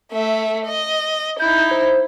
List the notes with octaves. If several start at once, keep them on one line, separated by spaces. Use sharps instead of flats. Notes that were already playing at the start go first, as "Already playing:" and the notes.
A3 E5
D#5
D#4 E4 G6
C5